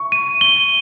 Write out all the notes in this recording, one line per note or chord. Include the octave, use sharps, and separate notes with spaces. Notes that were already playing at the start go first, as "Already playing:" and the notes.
Already playing: C#6
D#7
G7